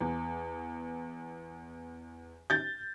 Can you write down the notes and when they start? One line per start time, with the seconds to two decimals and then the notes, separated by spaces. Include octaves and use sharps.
0.01 E2
2.50 G6 A6